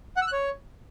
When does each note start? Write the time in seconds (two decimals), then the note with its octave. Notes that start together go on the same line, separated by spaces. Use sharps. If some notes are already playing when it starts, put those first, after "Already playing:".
0.17 F#5
0.22 E6
0.27 F#6
0.32 C#5